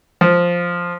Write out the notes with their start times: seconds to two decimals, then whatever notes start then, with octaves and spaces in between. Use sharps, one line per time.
0.21 F3